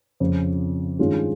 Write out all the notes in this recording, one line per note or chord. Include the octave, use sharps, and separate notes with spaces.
F2 C#3 F3
G2 D#3 G#3 C#4 F4